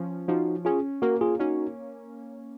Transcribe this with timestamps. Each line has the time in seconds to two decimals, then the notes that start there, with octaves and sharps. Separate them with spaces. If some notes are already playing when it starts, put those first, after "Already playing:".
Already playing: F3 C#4
0.28 F3 D#4 F#4
0.65 C#4 F4 G#4
1.02 A#3 F#4 A#4
1.21 F4 G#4
1.40 C#4 D#4 F#4